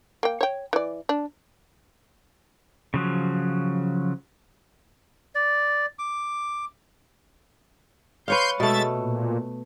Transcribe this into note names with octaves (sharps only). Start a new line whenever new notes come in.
A#3 G5
C#5 G5
E3 D5
D4
C#3 F3 F#3
D5
D6
B4 C#5 F5 C6 G6
B2 G#3 A3 E5 A6
A#2